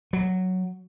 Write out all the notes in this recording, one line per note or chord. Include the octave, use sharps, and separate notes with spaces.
F#3